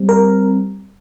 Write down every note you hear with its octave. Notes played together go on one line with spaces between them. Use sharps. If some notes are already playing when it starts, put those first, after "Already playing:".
Already playing: G3 C4
A#4